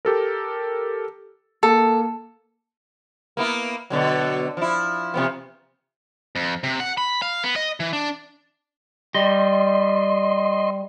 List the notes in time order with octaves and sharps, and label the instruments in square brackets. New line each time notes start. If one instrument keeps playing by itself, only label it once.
[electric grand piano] G4 A4 A#4
[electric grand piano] A#3 [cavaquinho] A4
[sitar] A#3 B3 E4
B2 D3 F#3
F3 E4
C3 F3 B3
[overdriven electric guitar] F2
C3
F#5
B5
F5
B3
D#5
E3
D4
[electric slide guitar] G3 [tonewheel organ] D#5 C6